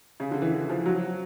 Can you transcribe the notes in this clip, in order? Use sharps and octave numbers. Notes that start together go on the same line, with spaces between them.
C#3
D3
E3
E3
F3
F#3